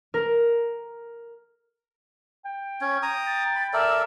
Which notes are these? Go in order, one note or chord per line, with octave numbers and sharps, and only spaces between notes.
A#4
G5
C#4 G#6
A#5 D#6
A6
B5
A4 A#4 D5 E5